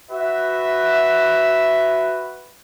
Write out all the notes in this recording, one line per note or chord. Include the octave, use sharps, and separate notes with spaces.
F#4 B4 E5